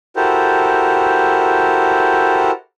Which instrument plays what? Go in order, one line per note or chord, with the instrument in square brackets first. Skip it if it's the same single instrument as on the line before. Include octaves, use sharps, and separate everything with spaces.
[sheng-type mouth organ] E4 F#4 G4 A4 A#4 C5